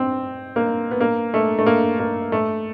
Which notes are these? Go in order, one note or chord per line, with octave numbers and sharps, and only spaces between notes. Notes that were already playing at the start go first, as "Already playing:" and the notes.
Already playing: C4
A#3
B3
A#3
A3
A3
A#3
A#3
A3